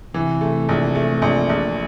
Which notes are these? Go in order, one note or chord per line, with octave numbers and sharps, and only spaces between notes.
C3 E3
A3
A#1
A3
A#1
A#1